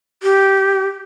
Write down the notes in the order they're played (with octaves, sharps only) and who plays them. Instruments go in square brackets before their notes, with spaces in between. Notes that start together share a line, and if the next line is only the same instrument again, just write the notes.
[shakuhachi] G4